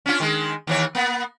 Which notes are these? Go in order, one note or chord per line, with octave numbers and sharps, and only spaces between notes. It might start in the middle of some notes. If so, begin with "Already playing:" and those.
C#4 D4 F4
D#3 G#3
D#2 E3 C#5
A#3 B3